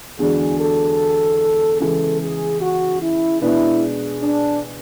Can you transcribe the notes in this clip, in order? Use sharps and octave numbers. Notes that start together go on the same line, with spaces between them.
E2 D3 G#3 D4 F#4 G#4
A4
C#3 E3 G#3 A4
G#4
F#4
E4
B2 G#3 D4 E4 G#4 B4
D4